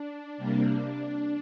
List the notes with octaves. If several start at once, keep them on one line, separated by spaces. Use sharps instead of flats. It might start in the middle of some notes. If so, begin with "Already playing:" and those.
Already playing: D4
C3 G3 A#3